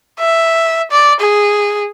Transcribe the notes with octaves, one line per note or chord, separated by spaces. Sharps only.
E5
D5
G#4